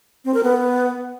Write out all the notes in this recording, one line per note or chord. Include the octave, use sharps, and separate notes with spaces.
C4
A#4
B3